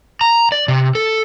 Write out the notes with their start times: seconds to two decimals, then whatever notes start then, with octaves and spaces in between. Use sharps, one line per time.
0.21 A#5
0.52 D5
0.68 C3
0.95 A4